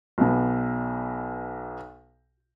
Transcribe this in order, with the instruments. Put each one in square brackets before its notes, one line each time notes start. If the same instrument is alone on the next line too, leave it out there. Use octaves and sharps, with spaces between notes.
[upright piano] B1 B2